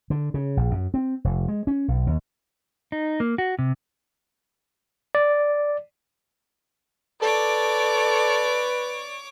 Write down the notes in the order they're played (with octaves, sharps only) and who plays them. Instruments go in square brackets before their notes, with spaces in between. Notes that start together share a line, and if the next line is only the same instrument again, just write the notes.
[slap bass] D3
C#3
A#1
F#2
C4
F1
G#3
C#4
B1
D#2
[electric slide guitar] D#4
A#3
F#4
C3
[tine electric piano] D5
[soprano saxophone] A4 [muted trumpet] B4 [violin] C#5 D6 [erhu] D5